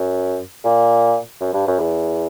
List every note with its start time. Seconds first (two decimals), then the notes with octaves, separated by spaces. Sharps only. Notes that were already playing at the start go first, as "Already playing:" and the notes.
Already playing: F#2
0.64 A#2
1.41 F#2
1.54 G2
1.67 F#2
1.80 E2